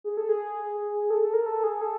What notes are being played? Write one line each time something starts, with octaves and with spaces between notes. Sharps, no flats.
G#4
A4
G#4
A4
A4
A#4
A4
G#4
A4